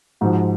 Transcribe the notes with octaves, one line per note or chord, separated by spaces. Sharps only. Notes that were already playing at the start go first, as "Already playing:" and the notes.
G#2 F3 F#4